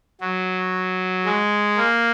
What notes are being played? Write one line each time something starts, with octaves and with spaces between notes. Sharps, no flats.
F#3
G#3
A#3